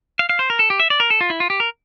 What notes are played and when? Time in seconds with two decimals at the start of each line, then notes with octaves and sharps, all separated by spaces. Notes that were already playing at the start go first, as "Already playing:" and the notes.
0.19 F5
0.29 F5
0.39 C5
0.50 A#4
0.59 A4
0.70 G4
0.80 E5
0.90 D5
1.00 A#4
1.10 A4
1.21 F4
1.30 E4
1.40 F4
1.50 G4
1.60 A#4